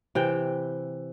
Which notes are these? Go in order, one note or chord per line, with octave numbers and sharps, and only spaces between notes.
C3 E3 G5